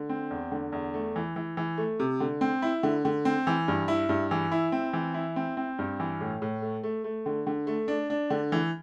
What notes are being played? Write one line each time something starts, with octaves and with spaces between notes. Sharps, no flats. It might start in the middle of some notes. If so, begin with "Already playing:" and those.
Already playing: D3
C4
E2
D3
E2
A3
E3
E3
E3
A3
C3
D3
C4
E4
D3
D3
C4
E3
G2
E4
G2
E3
E4
C4
E3
E4
C4
C4
G2
E3
A2
A2
A3
A3
A3
D3
D3
A3
D4
D4
D3
E3